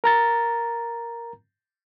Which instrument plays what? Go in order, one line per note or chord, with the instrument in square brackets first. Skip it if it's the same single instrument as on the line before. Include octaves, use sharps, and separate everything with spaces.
[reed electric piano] A#4 A#5 A6